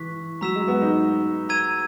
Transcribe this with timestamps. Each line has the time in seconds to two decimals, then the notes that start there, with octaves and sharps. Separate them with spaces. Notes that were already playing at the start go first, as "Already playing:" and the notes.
Already playing: E3 C#6 F#6 B6
0.41 F#3 A#5 E6 B6 E7
0.55 G#3
0.68 B3
0.82 D#4
1.49 A#5 E6 G#6 D#7